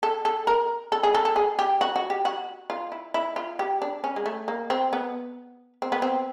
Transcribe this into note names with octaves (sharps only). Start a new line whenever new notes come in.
A4
A4
A#4
A4
G#4
A4
A4
G#4
G4
F#4
F#4
G4
F#4
F4
E4
E4
F4
G4
D4
C#4
G#3
A3
A#3
C4
B3
C4
B3
C4